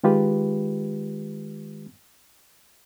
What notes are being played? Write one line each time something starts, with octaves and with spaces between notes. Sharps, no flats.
D#3 G#3 F4 G4 B4